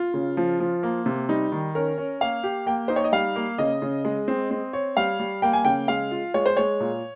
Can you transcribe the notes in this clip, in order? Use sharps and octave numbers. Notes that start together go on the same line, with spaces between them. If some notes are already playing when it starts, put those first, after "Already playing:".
Already playing: F4
C#3
F3
F3
A#3
C3
G3 D#4
D#3
C#4 A#4
C#4
A#3 F5
G4
A#3 G5
D#4 C5
C#5
D#5
G3 F5
A#3
C#3 D#5
C#3
G#3
C4
C4
C#5
G3 F5
G3
A#3 G5
G#5
C#3 G5
G#3 F5
F4
G#3 C#5
C5
G#3 C#5
A#2